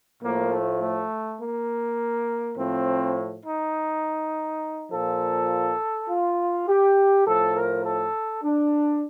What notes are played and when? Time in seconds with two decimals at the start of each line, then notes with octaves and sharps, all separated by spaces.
0.23 A2 F3 A#3
0.52 A3
0.82 A3
1.40 A#3
2.57 A2 F3 C4
3.45 D#4
4.92 A#2 F3 A4
6.09 F4
6.68 G4
7.26 A2 F3 A4
7.56 A#4
7.85 A4
8.44 D4